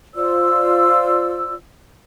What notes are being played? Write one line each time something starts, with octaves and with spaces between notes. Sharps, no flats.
F4 C5 D5 E6